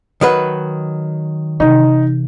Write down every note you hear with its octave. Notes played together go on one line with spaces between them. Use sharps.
D#3 F#3 B4
C3 E3 D#4